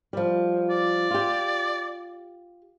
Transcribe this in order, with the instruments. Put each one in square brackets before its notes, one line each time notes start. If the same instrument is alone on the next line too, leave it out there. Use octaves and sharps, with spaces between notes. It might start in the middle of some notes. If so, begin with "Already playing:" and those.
[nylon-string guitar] F3 G3
[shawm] D5
[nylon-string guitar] F4 G4